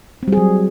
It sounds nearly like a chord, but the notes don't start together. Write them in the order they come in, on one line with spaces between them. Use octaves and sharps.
C4 G3 G#4 F#3